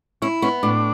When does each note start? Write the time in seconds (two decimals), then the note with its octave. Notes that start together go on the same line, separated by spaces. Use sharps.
0.22 C#4 E4
0.42 B3 C#4
0.63 A2 D4